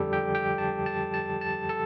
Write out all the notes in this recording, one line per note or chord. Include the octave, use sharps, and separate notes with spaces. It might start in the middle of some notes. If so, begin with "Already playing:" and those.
Already playing: F2 D3 F3 G3 G4 A4
G4 G5
G4 G5
A5
A5
A5
A5
A4 A5